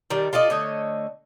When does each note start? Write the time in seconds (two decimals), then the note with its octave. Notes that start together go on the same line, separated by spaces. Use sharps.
0.10 D#3 G3 D4
0.33 F4 A4 D5 D#5
0.50 D3 A3 C#5 D#5